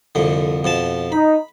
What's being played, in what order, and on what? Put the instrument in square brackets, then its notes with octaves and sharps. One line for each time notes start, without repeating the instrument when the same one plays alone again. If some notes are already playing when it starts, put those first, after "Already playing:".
[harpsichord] C2 F2 D3
F2 B2 A5
[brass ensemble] D#4 [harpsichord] B5